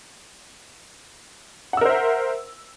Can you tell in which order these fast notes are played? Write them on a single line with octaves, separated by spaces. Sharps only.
F#5 E6 A#4 C5 E5